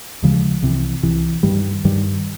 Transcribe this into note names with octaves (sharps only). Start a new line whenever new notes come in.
D#2 C#3 F3 G#3
C2 C3 E3
C2 C3 E3
G2 D#3 G3
G2 D#3 G3